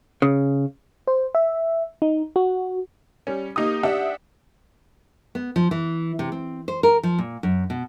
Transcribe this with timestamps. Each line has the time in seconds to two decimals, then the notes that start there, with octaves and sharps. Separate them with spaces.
0.22 C#3
1.07 C5
1.35 E5
2.02 D#4
2.36 F#4
3.27 G3 C#4
3.56 A#3 D#4 G4 D#6
3.83 D4 G4 E5 F#5
5.35 B3
5.56 F3
5.71 E3
6.19 C3
6.32 C4
6.68 C5
6.83 A#4
7.03 F3
7.19 A#2
7.43 F#2
7.70 B2